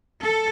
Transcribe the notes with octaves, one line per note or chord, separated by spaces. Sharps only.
A4